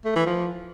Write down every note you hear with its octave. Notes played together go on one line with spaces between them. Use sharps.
A3
E3
F3